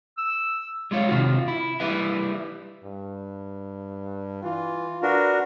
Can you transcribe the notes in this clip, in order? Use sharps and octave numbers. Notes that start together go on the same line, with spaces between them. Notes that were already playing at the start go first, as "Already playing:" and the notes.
E6
G3 G#3 F4 C#5
C3 D#3 F4 F#4
E4
G3 E4 B4 E5
G2
E3 F4
D4 F#4 A#4 B4